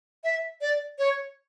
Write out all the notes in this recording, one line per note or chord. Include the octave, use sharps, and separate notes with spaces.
E5
D5
C#5